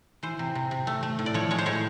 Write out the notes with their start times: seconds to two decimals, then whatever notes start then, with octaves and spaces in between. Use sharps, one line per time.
0.23 E3 C5
0.39 C3
0.55 C3
0.71 C3
0.87 A3
1.03 A3
1.19 A2
1.26 D5
1.34 F3 C#5
1.51 G#3 C#5
1.58 C5
1.66 A2 C#5